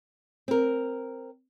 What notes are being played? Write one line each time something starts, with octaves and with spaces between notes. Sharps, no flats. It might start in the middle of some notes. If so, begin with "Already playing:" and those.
C4 A#4